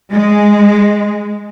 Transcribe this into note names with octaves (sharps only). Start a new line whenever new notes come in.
G#3